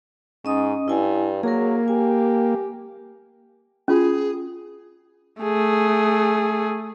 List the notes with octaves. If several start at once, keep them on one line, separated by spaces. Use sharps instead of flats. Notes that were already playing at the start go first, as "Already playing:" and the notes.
G#2 C#4 D#5 D#6
G2 E4 G#5
F#3 A#3 G#4 A#4
G4 G#5
C#4 F4 F#4 G#4
A3 G#4